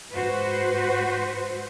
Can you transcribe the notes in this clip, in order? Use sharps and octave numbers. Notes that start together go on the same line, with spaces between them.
G#2 F#4 B4 C5